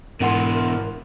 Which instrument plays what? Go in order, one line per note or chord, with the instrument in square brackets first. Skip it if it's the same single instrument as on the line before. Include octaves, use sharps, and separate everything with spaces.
[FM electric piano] G#2 F#5 C6 [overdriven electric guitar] B2 E3 [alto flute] A#4